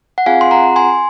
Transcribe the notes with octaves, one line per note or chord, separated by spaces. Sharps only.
F#5
C4 F4 G#4 F5 G#5
C6
F#5 A#5
G#5 C6